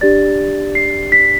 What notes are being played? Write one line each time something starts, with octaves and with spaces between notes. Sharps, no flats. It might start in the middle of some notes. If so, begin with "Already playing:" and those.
D4 G4 D5 A6
C7
B6